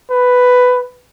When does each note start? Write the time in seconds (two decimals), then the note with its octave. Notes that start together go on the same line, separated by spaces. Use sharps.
0.10 B4